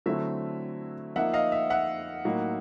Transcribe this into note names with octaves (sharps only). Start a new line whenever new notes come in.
D3 F#3 A3 C4 E4 E5
F3 A#3 D#4 E5 F#5
D#5 F5
E5
E5 F#5
A2 F#3 A#3 D#4